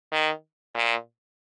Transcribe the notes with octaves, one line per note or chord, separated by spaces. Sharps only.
D#3
A#2